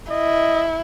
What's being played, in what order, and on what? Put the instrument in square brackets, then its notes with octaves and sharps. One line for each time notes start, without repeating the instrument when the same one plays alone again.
[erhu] E4 [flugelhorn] D#5